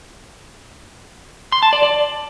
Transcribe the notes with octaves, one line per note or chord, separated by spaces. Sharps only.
C6
A5
D5
D5